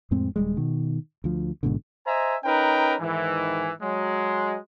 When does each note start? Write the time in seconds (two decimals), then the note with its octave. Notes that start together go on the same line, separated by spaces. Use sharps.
0.11 F2 A2 G#3 C4
0.36 D#1 G3 G#3
0.57 B2 D#3
1.24 D2 F3
1.63 A1 G#2 B2 D3
2.05 C5 D#5 E5 G#5 A#5
2.44 C#4 D#4 A#4 B4 G5
3.00 G#2 D#3 E3
3.81 F#3 G#3